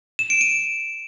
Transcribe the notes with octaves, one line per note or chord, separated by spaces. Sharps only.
E7
D7
D#7